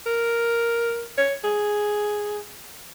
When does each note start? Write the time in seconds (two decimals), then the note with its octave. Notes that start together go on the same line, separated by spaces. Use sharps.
0.06 A#4
1.18 C#5
1.44 G#4